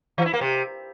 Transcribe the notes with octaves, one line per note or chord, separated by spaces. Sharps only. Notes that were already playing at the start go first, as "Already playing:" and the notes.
E3
E4
A#3
C3